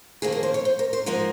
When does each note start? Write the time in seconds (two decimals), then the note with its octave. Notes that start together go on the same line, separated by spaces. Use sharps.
0.22 F2 D#3 A#3 G#4
0.32 A#4
0.43 C5
0.54 C#5
0.65 C5
0.79 A#4
0.93 C5
1.06 G#2 F3 A#3 A#4